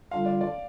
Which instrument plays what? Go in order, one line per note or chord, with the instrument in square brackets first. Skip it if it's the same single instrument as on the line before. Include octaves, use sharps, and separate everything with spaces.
[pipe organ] D3 G3 D4 F4 [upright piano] F5
[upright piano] D5
D5